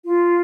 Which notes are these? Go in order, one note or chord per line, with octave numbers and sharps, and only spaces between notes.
F4